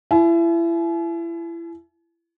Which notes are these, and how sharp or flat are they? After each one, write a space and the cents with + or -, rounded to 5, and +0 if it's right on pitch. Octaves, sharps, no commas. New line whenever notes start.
E4 +30 G#5 +45